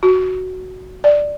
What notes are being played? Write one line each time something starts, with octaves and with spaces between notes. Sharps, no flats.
F#4
D5